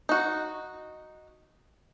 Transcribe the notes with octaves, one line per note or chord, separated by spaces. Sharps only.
D#4 F#4